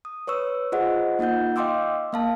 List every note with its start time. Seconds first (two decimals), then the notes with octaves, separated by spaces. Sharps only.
0.05 D#6
0.27 B4 C#5 C#6 E6
0.72 F4 G#4 C5 D#5 F#5
1.19 A#3 D#4 F4 F#5 G6
1.56 D#5 F5 G5 C6 D6 E6
2.13 A#3 F5 A5